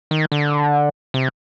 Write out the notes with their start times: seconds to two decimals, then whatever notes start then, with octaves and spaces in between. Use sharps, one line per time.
0.11 D#3
0.32 D3
1.14 C3